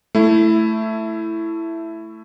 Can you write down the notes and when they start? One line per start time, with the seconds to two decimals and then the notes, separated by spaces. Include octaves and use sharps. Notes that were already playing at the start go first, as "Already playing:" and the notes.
0.15 A3 E4